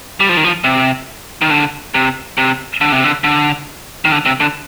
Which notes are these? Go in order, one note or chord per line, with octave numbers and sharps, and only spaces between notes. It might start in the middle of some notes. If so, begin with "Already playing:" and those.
G3
F3
D#3
F3
C3
D#3
D3
C3
C3
D3
C3
D3
D3
D#3
D3
C3
D3